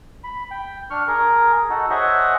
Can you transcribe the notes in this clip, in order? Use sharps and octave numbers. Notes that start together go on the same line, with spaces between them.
B5
G5
D4 C#6 F6
G#4 A#4
D#4 F#4 A4
G#4 C5 C#5 D#5 E5 F#5